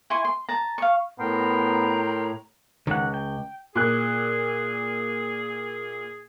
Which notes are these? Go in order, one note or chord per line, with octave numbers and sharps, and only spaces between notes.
E4 G#5 C6 C#6
C6
A5 A#5
F5 C#6
A2 B3 A#4 G5 A#5 C6
C#2 D#3 F#5
G5
A#2 G#4 F#6